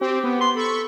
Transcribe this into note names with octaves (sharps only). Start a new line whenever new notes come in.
C4 G4
B3
C6
A4 B5 C#6